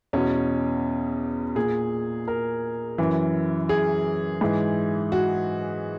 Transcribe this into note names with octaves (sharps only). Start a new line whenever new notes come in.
E2 B2 C#4
A#2 G#4
A#4
F#2 E3
G#4
G#2 E3
F#4